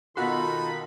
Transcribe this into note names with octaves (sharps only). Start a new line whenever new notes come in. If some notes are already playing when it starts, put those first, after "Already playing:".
B2 D#3 D#4 F4 F#4 A4 A#4 B5